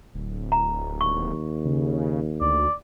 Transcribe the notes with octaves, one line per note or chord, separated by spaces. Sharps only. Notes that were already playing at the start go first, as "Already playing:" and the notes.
D1
A#5
D#2 C#6
C#3
D2 D5